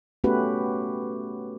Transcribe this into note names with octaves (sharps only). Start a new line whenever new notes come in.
A3 B3 C#4 F#4 G4 B4